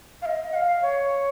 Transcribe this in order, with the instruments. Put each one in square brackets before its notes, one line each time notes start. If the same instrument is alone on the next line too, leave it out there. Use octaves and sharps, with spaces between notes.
[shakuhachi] F5
D#5
F#5
F5
C#5